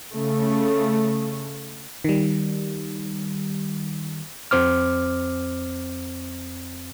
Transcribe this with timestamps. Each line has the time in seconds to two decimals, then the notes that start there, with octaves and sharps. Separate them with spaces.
0.13 C#3 A3
2.04 D#3 G3
4.51 F2 C4 C5 D6 F6